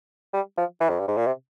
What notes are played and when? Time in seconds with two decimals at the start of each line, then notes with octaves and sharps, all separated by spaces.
0.33 G3
0.57 F3
0.81 E3
0.89 F2
0.99 G2
1.08 G#2
1.17 A#2
1.26 C3